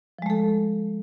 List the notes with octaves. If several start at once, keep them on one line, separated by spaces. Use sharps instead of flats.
F3 G#3 A3 A4